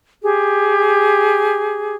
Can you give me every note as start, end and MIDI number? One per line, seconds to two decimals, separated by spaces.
0.22 1.95 67
0.22 1.95 68